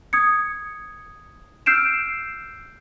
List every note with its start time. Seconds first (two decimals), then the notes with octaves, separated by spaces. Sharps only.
0.13 D#6 G#6 C#7
1.66 E6 F6 G6 C7 D7 E7